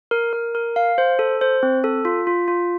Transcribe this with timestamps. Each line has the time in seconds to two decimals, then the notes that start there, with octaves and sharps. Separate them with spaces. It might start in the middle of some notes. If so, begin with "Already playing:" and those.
0.11 A#4
0.33 A#4
0.55 A#4
0.76 F5
0.98 C5
1.19 A4
1.41 C5
1.63 C4
1.84 A4
2.05 F4
2.27 F4
2.48 F4